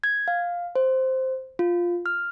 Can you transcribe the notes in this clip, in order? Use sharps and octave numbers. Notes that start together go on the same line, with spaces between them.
G#6
F5
C5
F4
F6